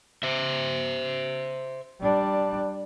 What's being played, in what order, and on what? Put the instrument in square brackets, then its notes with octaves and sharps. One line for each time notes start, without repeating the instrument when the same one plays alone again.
[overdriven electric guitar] C5 E5
[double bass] G3 D4